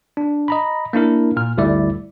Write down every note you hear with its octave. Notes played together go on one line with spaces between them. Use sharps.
D4
D#5 A#5 B5
A#3 D4 E4 A#4
A#2 F6
G1 D2 G3 E4 D5 E5